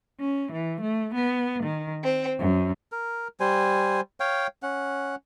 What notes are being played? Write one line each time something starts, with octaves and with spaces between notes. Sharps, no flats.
C#4
E3
A3
B3
D#3
C4
F#2
A#4
G3 C5 G#5
C#5 F5 G5
C#4 F#5